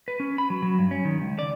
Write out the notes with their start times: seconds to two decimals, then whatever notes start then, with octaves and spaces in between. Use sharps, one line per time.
0.08 B4
0.20 C#4
0.38 B5
0.50 F#3
0.63 F#3
0.79 G2
0.91 C#4
1.05 D#3
1.22 C#2
1.39 D5